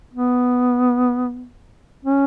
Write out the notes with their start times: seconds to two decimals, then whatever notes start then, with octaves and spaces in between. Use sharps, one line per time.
0.14 B3
2.05 C#4